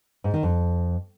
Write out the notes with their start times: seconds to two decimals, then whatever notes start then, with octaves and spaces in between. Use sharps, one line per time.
0.24 G#2
0.34 D#3
0.43 F2